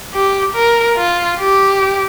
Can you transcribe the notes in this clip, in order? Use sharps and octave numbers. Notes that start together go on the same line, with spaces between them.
G4
A#4
F4
G4